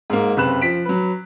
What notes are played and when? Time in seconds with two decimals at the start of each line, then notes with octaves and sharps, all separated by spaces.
0.10 G#2 A#3
0.36 F#1 C3 B4 F#6 E7
0.61 F3 B6 D7
0.85 F#3 B4